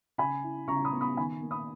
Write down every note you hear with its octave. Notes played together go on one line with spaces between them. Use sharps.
C#3 G#5 B5
E4
C#3 A#5 C#6
B5 D#6
B3
B5 D#6
D#3 G#5 B5
A#3
B5 D#6